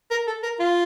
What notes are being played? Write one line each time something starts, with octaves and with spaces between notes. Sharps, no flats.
A#4
A4
A#4
F4